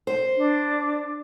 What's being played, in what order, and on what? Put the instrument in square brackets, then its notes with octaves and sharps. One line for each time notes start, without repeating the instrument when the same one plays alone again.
[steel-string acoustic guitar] C5
[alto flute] D4